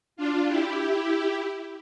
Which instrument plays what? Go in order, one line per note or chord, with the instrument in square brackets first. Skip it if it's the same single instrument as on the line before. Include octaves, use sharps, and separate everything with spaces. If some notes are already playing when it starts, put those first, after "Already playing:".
[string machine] D4 F4
E4 G4